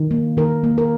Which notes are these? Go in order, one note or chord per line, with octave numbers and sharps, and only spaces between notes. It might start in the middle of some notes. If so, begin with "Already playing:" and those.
Already playing: D#3
A#3
D#3 A#4
A#3
A#4